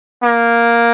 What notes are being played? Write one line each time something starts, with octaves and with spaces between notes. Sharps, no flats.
A#3